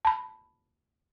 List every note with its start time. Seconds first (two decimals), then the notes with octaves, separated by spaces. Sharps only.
0.05 A5 B5